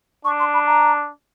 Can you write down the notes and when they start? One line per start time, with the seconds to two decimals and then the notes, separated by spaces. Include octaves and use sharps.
0.24 D4 C#6
0.39 C6
0.53 B5
0.66 A#5